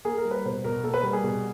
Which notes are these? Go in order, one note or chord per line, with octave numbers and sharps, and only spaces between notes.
A#3 G#4
A#4
G3
B4
B2 C5
B2 A#4
A#3 A4
B4
G3
G#4
B2